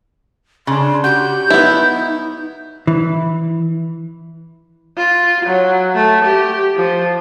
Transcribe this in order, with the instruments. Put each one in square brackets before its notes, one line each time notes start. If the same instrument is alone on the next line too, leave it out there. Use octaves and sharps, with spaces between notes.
[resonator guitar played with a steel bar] C#3 D4 [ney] C6
[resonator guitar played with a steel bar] F#4 [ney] G4 [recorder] G6
[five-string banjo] B3 E4 [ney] D#4
[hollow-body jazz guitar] E3
[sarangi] F4
F#3
A3
G4
F3